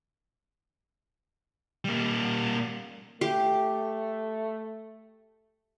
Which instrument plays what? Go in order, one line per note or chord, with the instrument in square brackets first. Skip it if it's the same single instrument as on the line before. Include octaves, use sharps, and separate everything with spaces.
[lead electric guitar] G3 A#3
[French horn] A3 [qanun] G4